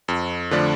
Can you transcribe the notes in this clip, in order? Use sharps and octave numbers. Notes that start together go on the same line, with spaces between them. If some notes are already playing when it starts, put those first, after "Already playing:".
F2
D3 F3 A3 D4